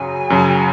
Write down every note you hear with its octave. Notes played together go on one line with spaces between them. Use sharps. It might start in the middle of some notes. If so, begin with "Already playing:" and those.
Already playing: F#2 C#3 F#3 G#5
F#2 C#3 F#3